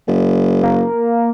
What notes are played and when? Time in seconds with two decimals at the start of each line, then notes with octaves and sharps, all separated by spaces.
0.07 F#1
0.63 A#3